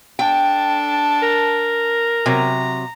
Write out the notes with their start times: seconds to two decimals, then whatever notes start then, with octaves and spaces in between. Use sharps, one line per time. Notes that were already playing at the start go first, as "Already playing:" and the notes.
0.19 D4 A4 G5
1.23 A#4
2.26 C3 F#3 A#5